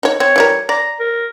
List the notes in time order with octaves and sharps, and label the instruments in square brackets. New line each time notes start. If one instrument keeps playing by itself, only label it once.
[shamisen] D#4 C#5
[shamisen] C4 [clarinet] C#5
[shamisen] E3 G3 A#4
[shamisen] D5 [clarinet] A#5
[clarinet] A#4